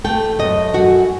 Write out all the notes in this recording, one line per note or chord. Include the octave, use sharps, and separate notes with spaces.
A3 G5
F#2 D#5
F#2 F#4